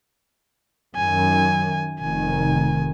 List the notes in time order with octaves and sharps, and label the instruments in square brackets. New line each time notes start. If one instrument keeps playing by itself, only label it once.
[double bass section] F#2 D#3 [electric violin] G#5
[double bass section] F1 D#3 [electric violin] G#5